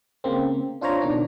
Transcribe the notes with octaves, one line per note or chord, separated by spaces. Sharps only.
C#3 A#3 C4
D4 F4 C5 C#5 A#5
B2 D#3 D4